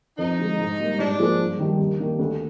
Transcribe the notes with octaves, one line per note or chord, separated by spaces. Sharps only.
F2 D#4
D3 G#3
G#2
G3 A#3
G#2 D4
F3 A#3 F4 G#4
G2
D#3 G3 D4 G4
D#2
D#3 A#3 D4 G4
D2